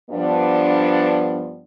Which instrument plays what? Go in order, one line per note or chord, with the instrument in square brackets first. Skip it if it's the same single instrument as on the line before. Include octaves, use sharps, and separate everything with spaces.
[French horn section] G2 F3 B3 D4